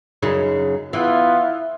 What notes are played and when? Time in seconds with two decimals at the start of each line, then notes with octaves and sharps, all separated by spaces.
0.22 F#2 C#3 D#4
0.93 E3 B3 F4